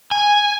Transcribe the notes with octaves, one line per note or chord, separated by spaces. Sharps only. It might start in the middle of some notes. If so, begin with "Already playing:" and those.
G#5